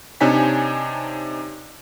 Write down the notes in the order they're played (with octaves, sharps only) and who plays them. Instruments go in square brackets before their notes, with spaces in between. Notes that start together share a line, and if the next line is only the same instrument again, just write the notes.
[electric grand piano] C3 D4 D#4 C#5 G#5 B6